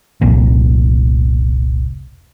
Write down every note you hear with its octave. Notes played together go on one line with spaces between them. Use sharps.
F1 C2 A#2